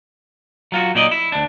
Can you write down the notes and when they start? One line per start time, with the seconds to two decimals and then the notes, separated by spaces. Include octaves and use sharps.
0.72 F#3 F4 F#4
0.95 A#2 F#3 D#4 D5 D#5
1.11 E4
1.32 D2 D4